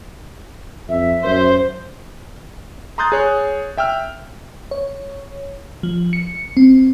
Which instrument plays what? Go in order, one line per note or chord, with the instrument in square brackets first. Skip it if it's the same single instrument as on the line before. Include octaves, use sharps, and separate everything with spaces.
[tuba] F2 [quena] E5
[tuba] F#2 [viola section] C5
[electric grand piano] A#5 C6 D#6 F#6 G6 A6
G#4 C#5 F#6
E5 G5 E6 F6
[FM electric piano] C#5
F3
C#7
C4